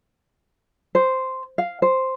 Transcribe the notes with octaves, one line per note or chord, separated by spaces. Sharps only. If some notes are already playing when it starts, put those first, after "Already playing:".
C5
F5
C5